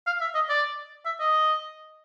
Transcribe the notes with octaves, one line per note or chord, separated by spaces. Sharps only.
F5
E5
D#5
D5
E5
D#5